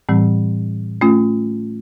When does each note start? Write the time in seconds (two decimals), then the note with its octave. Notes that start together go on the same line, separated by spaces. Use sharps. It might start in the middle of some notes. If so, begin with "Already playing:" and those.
0.09 A2 E3 G3 C4
1.01 A3 C#4 F4